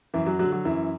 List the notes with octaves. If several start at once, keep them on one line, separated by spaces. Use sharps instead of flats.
F#2 E3 E4
F#3 F#4
D3 F#3 F#4
F#3 F#4
F#2 E3 E4